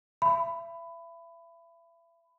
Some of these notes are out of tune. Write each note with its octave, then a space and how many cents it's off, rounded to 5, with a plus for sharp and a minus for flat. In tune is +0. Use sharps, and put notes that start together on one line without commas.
E5 +35 B5 +15